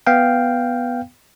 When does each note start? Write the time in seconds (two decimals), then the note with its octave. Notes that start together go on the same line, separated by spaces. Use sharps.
0.07 B3 F5 G5